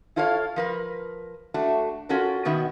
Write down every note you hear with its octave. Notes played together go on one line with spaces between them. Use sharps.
E4 F4 A4 C#5 E5 F5
F3 A#4 B4
A3 D4 F#4
C#4 F4 F#4 A4 A#4
B2 D#3 B3 F#4 E5